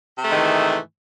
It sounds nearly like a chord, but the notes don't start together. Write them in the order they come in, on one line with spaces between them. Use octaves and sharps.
C3 A3 G#2 D#3 E3